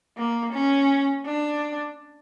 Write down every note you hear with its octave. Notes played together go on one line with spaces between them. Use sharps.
A#3
C#4
D4